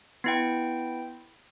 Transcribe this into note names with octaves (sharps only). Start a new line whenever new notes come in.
B3 E4 G5